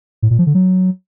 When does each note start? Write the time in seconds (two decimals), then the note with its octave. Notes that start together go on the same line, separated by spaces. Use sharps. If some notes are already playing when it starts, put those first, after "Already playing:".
0.22 A2
0.31 A#2
0.39 F3
0.47 D3
0.55 F#3